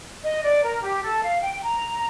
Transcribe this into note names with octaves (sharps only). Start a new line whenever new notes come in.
D#5
D5
A#4
G4
A4
F5
G5
A#5